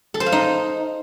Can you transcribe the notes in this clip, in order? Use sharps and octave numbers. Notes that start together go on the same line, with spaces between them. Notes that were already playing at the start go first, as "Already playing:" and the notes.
A4
C5
F5
D#4